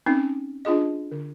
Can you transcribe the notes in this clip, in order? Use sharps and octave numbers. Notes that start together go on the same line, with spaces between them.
C4 C#4 D#4
D4 F4 G#4 D#5
D3